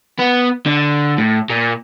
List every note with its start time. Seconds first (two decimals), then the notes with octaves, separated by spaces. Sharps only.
0.19 B3
0.66 D3
1.18 A2
1.50 A#2